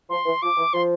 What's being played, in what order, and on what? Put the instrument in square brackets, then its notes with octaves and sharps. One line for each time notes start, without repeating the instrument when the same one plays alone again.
[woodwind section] F3 [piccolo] C6
[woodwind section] E3
[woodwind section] F3 [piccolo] D6
[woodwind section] E3
[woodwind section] F3 [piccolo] C6